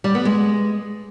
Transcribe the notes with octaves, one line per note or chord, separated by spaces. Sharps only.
G3
B3
G#3